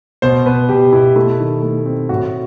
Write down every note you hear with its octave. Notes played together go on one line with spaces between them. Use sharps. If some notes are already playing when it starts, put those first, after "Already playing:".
B2 C5
B2 B4
B2 G4
B2 E4
A3 E4
D#3
A3
C4
A2 F#4